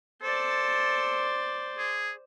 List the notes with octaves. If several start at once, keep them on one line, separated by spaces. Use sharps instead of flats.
A4 C5 D5
G#4